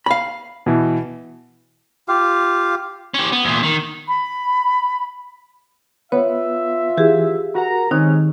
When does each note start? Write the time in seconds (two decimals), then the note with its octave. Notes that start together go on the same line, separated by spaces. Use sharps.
0.06 F5 B5
0.66 B2 E3
2.08 F4 G4 F5
3.14 C#4 G4
3.32 B3
3.45 E2 A#2
3.63 D#3
4.08 B5
6.12 B3 F4 B4 C#5 E5
6.98 E3 G4 G#4
7.55 F#4 A#4 F#5 A#5
7.91 D#3 G#3 C4 C#4 D#4